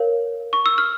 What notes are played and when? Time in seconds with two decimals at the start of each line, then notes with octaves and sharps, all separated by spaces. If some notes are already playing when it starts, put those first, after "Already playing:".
Already playing: A#4 C#5 F5
0.53 C#6
0.66 E6
0.78 F6